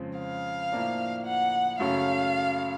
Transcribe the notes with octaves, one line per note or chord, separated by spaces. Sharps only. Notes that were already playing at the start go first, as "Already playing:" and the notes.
Already playing: F2 C#3 F3 G#3 C4
F5
A2 F3 A#3 D4
F#5
F#2 C#3 F#3 A3 C#4 F5